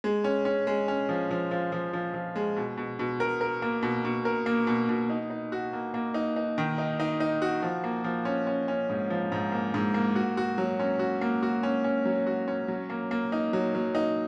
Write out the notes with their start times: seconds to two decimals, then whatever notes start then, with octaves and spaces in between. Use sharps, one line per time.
0.04 G#3
0.24 C#4
0.45 C#4
0.67 G#3
0.88 C#4
1.09 F3
1.31 F3
1.51 F3
1.72 F3
1.93 F3
2.14 F3
2.36 G#3
2.56 B2
2.77 B2
2.99 B2
3.20 A#4
3.41 A#4
3.62 A#3
3.83 B2
4.05 B2
4.25 A#4
4.46 A#3
4.67 B2
4.89 B2
5.10 D#4
5.30 D#4
5.52 F#4
5.73 A#3
5.94 A#3
6.14 D#4
6.36 D#4
6.58 D#3
6.78 D#4
7.00 D#4
7.20 D#4
7.42 F#4
7.62 F3
7.84 A#3
8.04 F3
8.25 C#4
8.47 C#4
8.68 C#4
8.90 G#2
9.10 F3
9.32 G#2
9.52 A#3
9.74 G#2
9.94 A#3
10.16 F#4
10.37 F#4
10.58 F#3
10.80 C#4
10.99 F#4
11.21 A#3
11.43 F#4
11.63 C#4
11.84 C#4
12.05 F#3
12.27 F#4
12.48 C#4
12.68 F#3
12.90 A#3
13.11 A#3
13.32 D#4
13.53 F#3
13.75 F#3
13.95 D#4